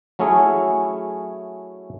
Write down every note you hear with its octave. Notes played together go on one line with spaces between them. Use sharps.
F#3 A3 C#4 E4 G#4